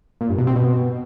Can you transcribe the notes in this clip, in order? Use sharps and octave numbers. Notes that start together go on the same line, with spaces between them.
A#2
G2
B2
C4
B2